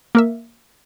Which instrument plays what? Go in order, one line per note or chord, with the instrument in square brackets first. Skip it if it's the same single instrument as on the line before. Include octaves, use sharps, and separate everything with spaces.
[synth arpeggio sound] A#3 A#4 E5